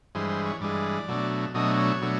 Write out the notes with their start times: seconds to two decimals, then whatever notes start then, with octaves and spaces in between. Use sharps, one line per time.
0.15 G2 E3 G#3 C5
0.29 C5
0.45 C#5
0.61 G2 E3 G#3 D5
1.08 B2 F#3 A3 D4
1.54 B2 F#3 A3 D4 D#5
1.78 C#5
2.01 B2 F#3 A3 D4